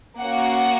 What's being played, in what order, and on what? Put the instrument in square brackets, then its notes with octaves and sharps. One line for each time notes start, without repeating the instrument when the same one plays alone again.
[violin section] A#3 C#4 F#4 F#5